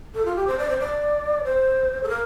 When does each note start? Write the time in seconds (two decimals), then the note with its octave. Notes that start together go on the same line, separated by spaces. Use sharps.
0.15 A4
0.25 F4
0.36 G4
0.47 C5
0.58 D5
0.69 C5
0.79 D5
1.44 C5
2.03 A4
2.09 A#4